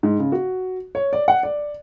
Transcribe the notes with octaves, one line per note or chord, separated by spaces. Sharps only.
G#2
C#3
F#4
C#5
D5
F#5
D5